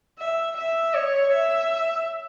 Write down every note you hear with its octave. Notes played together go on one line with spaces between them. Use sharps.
E5
E5
C#5
E5